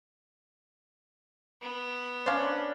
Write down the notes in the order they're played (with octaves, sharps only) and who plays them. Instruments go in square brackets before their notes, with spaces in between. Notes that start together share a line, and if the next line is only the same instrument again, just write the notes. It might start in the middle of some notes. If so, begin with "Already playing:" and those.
[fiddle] B3
[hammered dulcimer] C#4 D4 [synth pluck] C5 F5